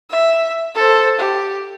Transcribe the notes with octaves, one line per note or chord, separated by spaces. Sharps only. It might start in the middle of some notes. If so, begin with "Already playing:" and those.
E5
A4 C5
G4